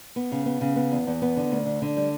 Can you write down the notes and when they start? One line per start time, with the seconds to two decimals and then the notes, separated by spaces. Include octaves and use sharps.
0.16 B3
0.32 C#3
0.46 B3
0.61 C#3
0.76 B3
0.92 E2
1.07 E2
1.22 B3
1.37 D3
1.52 D2
1.66 D3
1.82 D3
1.97 G3